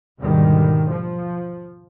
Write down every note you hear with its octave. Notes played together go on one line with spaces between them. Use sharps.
D#2 G#2 B2 D3 D#3 G3
F3